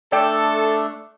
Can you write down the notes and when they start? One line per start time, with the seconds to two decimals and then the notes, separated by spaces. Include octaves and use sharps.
0.12 A3 D4 A4 D5 G5